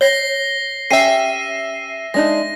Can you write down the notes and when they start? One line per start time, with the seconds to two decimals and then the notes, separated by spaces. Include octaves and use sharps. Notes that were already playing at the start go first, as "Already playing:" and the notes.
0.01 C#5 A#6 C7 G7
0.91 C#4 G4 E5 G#5 C7 D#7
2.14 G#3 D4 D#4 A#6